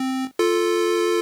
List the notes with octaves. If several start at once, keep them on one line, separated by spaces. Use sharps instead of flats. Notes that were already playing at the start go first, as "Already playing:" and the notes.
Already playing: C4
F4 A4